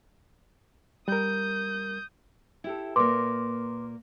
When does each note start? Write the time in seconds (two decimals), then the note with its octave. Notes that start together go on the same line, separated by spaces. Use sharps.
1.08 G3 A#4 D#6 G6
2.64 E4 G4 A4
2.96 A#2 A#3 B4 C6 D6